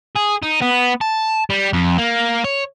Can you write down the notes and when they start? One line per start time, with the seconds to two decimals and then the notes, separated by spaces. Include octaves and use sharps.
0.16 G#4
0.43 D#4
0.62 B3
1.01 A5
1.50 G3
1.73 F2
1.98 A#3
2.45 C#5